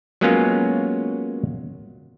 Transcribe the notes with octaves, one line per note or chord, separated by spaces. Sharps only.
F#3 G#3 A#3 B3 C#4 F4